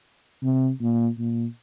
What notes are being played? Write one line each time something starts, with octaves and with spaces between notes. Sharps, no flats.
C3
A#2
A#2